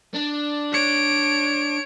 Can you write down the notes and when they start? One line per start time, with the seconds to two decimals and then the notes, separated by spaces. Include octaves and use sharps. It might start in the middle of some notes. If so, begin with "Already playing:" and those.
0.15 D4
0.72 C#5 D7